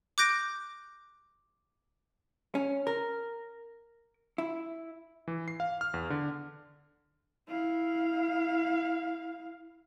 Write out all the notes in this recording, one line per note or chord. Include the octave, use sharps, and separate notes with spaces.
D6 F#6 G6 A#6 D7
C#4
A#4
E4
E3
C7
F5
F6
E2
D3
E4 F5